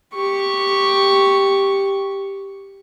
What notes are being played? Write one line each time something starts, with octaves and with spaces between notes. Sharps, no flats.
G4 C#6